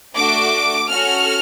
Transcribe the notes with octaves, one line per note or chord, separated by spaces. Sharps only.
A3 D4 F#4 D6
C#4 F#4 A4 F6